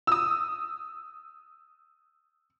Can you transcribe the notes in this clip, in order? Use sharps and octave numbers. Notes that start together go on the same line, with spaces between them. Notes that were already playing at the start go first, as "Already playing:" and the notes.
D#6 E6